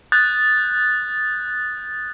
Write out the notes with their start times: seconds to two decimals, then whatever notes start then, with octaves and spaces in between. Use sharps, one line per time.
0.12 D#6 F#6 G6 A6